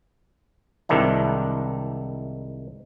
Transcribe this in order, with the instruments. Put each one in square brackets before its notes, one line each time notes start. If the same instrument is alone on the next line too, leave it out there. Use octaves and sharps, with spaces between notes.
[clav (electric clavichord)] C2 G#2 D#3 D4 E4